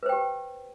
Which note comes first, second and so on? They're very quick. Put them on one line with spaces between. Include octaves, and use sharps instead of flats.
B4 C5 G5 G4